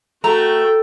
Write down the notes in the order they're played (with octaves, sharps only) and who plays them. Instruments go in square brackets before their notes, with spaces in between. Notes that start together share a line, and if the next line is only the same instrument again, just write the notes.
[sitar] A3 [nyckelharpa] F#4 G5 [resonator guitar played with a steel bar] A#5